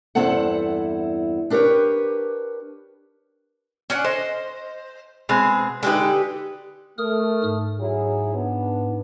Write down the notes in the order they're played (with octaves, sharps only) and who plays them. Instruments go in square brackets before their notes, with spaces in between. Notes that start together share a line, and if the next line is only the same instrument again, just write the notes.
[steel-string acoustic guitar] E2 G2 C4 E4 A4 F#5
D4 G4 A#4 B4 C#5
[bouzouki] C#4 D4 F#5
[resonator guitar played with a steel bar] C5 [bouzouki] D#5
[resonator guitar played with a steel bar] B2 G#3 C4 [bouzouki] G#4
[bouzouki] D3 G4 B4 [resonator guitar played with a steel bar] G#3 D#4
[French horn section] A3 [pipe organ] A#4 D#6 F6
[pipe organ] G#2
[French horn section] F#3 E4 G#4
B3 D4